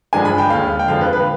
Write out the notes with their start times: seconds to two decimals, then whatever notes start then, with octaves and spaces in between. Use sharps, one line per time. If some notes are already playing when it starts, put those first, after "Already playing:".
0.13 G2 F3 G#3 D4 G#5
0.25 B5
0.38 G5
0.50 D#2 D3 G#3 F5
0.79 G5
0.88 F2 D3 F3 G#3 F5
1.01 B4
1.13 B4